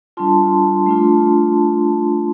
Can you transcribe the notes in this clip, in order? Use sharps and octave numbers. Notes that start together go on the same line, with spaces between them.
G3 D4 F4 A5 C6
A3 D4 F4